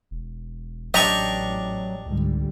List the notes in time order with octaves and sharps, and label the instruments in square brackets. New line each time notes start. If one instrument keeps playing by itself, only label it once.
[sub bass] E1
[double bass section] A1 [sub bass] F#3 [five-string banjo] D4 G4 [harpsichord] D#5 A#5 C#6
[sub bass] C#2 [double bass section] G#2 D3 G3